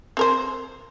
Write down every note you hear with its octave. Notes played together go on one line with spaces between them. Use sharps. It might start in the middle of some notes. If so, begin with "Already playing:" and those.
C4 A#4 C5